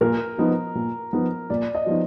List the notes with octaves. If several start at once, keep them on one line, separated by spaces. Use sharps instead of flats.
A#2 A#4
F3 B3 D#4
A#2
F3 B3 D#4
A#2 D5
D#5
F3 B3 D#4